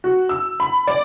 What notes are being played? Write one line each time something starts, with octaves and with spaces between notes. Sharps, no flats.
F#4
E6
B5
D5